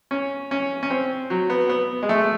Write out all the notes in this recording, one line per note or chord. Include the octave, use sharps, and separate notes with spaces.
C#4
C#4
C#4
C4
F#3
B3
B3
G#3
A3